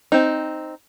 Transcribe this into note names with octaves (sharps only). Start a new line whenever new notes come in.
C4 D#4